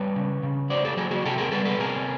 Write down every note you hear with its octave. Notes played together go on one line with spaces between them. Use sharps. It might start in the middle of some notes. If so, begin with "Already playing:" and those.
Already playing: G3 B4 C#5
C#3
C#3
F#3 C5 D5
G4 A4
F#3 F#4 G#4
F#4 G#4
C3 G4 A4
G#4 A#4
G3 A4 B4
A4 B4
C3 G#4 A#4